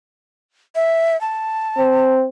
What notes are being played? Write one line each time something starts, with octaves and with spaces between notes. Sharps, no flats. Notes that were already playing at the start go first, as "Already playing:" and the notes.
E5
A5
C4